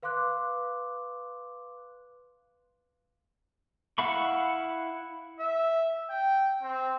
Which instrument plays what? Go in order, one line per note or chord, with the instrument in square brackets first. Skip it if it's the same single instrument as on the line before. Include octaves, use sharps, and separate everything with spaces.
[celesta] B4 F5 C6 D6 F#6
[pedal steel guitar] E4 F5 F#5 B5 C#6
[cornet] E5
G5
C4